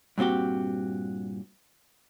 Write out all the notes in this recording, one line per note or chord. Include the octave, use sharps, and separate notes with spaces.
G2 A#2 C4 F#4 G4